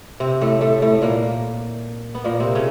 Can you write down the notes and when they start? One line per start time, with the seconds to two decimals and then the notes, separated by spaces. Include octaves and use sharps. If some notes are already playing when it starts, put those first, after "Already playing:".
0.20 C3 C4
0.41 A2 A3
0.61 A2 A3
0.82 A2 A3
1.02 A#2 A#3
2.15 B3
2.24 A#2 A#3
2.40 C3 C4
2.55 C#3 C#4